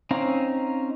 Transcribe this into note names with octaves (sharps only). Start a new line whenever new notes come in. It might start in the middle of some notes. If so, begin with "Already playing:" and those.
C4 C#4 D#4 F5 A#5